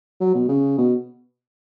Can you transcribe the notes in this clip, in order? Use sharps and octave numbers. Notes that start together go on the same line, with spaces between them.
F#3
B2
C#3
B2